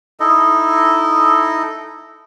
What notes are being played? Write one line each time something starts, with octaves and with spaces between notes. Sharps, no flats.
D#4 E4 A4 D#5